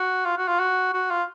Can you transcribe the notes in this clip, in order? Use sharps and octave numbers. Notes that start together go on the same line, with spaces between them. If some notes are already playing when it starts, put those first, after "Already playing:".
Already playing: F#4
F4
F#4
F4
F#4
F#4
F4